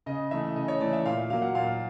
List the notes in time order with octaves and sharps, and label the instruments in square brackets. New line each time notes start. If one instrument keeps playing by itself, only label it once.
[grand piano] C#3 D#5
E3 A3 E5
C#3 D#5
C#5
E3 A3 D5
E5
A#2 F5
F#3 A#3 F5
F#5
A#2 F5